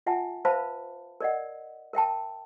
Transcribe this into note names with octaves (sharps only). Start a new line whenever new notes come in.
F4 E5 F#5 G#5 A5
B4 C5 E5 F5 A5 B5
A#4 D5 D#5 F#5
A#4 E5 G5 A5